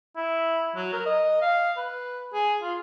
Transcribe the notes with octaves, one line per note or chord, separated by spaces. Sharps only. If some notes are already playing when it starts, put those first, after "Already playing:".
E4
F#3
A#4
D#5
F5
B4
G#4
F4